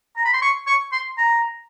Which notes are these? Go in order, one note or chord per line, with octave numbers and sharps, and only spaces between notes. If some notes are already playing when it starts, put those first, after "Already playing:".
A#5
B5
C6
C#6
C#6
C6
A#5